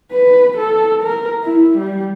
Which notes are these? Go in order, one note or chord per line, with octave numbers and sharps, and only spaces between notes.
B4
A4
A#4
E4
G3